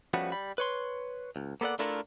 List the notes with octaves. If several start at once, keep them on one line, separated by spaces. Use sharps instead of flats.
F3 G3 A3 B3 C#4 F#4
G3 B5
B4 C#5 C6
C#2
A#3 B3 A4 D5 F#5
A3 D4 E4 F4 A4 A#4